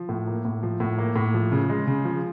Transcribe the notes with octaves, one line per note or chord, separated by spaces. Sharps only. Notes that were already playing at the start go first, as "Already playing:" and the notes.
Already playing: F3
A2
A#3
A2
F3
A2
A#3
A2
F3
C#3
G#3
C#3
F3